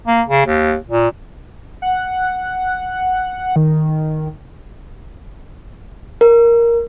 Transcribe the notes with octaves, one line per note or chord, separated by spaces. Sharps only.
A#3
C#3
D#2
A#2
F#5
D#3
A#4